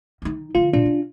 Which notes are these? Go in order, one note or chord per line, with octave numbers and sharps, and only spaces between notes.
D#3 D#4
D3 F3 F4
A#2 D4 F4
C#4